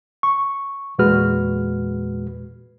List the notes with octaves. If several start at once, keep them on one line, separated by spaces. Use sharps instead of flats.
C#6
E2 A#2 G#3 F#4 B4 F6